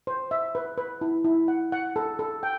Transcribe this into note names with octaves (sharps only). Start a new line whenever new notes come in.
C5
E5
B4
B4
E4
E4
F#5
F#5
A4
A4
G5